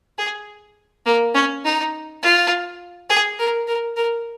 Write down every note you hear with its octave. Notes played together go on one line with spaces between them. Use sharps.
G#4
A#3
C#4
D#4
F4
G#4
A#4
A#4
A#4